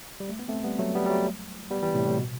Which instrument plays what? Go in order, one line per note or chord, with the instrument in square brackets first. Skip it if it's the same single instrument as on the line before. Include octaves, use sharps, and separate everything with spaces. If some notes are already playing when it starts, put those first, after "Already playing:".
[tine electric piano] G3
A3
B3
A3 C4
G3 B3
F#3 A3
G3 B3
G3
F#3 A3
G3 B3
E3 G3
A2 C3
A2
B2